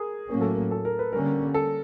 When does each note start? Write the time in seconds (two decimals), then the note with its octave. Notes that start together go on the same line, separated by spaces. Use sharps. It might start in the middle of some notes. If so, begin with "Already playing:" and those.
Already playing: G#4 A#4
0.29 A2 F#3 A#3 C#4 A#4
0.41 A4
0.53 A#4
0.71 A4
0.85 A#4
0.99 B4
1.13 D3 G3 A#3 C#4 A#4
1.54 A4